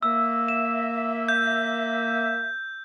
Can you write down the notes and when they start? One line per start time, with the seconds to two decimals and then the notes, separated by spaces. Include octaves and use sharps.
0.03 A#3 E5 E6
0.48 E7
1.28 G6